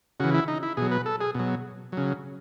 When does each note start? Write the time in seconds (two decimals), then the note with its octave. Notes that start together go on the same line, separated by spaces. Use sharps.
0.20 C#3 E3 F#4
0.34 E4
0.48 D#4
0.63 E4
0.77 B2 F#3 G#4
0.91 B4
1.06 A4
1.21 G#4
1.35 B2 F#3
1.92 C#3 F#3